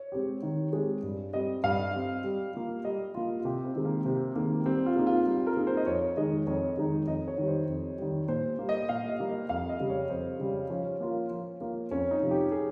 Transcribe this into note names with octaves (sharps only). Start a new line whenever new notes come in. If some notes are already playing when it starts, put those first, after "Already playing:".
Already playing: C#5
G#3 C4 G4
D#3
G#3 C4 G4
G2
G3 C4 D#5
G2 F5
G3 C4
G3
A#3 F4
G3 D#5
A#3 F4
F4
C3 G4
C4
D#3 G#3
A#3
C3 C4
D#3 G#3 A#3
G3 C4
F4
A#3 D#4 G#4
F4
G3
A#4
A#3 D#4 G#4
C5
D#5
F2 C#5
D#3 G#3 D#4 D#5
F2 C#5
D#3 G#3 D#4
F2 D#5
C#5
D#3 G3
C5
F2
D#3 G3
A#2 C5
G3 A#3
D#5
A#2 F5
D#5
G3 A#3
D#5
F2 F5
D#5
C#3 G3
C#5
F2 C5
C#3 G3
F3 C#4
A#3 F4 A#4
F3
A#3 F4 A#4
F2 C#4
D#4
C3 F3
G4
G#4